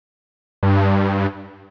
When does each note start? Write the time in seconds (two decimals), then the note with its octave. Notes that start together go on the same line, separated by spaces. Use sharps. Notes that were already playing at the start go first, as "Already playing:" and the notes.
0.63 G2